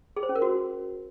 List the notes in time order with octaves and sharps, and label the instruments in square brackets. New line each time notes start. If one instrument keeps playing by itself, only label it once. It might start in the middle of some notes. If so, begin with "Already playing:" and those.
[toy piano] G#4
C5
C#4
A#4
F#4